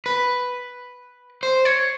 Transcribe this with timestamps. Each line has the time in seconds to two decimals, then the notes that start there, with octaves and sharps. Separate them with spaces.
0.06 B4
1.43 C5
1.65 C#5